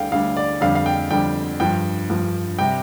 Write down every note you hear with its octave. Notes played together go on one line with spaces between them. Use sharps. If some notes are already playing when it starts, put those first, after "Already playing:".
Already playing: D2 D3 G3 F5 G5
D2 D3 G3 F5
D5
F2 D3 G3 F5
F5
G5
F2 D3 G3 G5
G2 F3 G5
G2 F3
C3 G3 G5